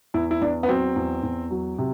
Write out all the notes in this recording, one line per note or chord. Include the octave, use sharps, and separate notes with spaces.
E2 E4
E4
E2 D4
B3
F#3 C4
E2
E2
F#3
C3